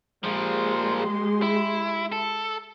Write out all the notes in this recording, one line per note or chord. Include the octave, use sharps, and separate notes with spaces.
A#2 F3 G#3 G4 C6
E4
A4